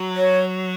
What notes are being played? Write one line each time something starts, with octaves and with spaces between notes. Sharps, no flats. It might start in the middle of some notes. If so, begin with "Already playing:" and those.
Already playing: F#3
C#5